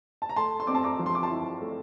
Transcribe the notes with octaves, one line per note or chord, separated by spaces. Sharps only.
A5
A#5
A3 A5 C6
C6
C4 D6
A5 C6
A#5 D6
F3
C6
D6
A5 C6
E4
A3